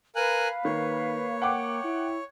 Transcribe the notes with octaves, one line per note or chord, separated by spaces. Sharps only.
A#4 B4 F5 G#5 F#6
D#3 A#3 C#5
F#5 G5 D6
E4